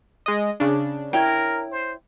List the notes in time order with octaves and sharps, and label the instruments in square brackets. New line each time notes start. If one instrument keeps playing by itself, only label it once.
[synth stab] G#3 D#5
C#3 D4
[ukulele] E4 C#5 G5 [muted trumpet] A#4
[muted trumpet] C5